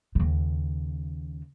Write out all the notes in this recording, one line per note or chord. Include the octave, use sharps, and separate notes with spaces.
D#2 C#3